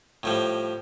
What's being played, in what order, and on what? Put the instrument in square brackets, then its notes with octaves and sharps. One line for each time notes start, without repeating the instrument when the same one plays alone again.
[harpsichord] A2 F3 G3